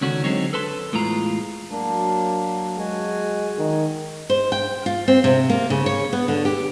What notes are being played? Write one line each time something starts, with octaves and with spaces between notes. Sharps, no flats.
C#2 D3 D#3 C#4 D4 F#4
D3 F#3 G#3 C4 D#4 C#5
A4 B4 A5 C6
E2 A2 G#3 F4 A#5
F#3 A#3 D4
G#3 F#4 G#5
D#3
C5
G5
F4
C4
C3
A#3
C#3
C#5
B3
D3
G4